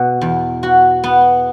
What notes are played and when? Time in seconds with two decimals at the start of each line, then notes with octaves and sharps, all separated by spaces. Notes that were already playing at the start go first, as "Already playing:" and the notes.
Already playing: B2
0.21 E2
0.63 F#4
1.04 B3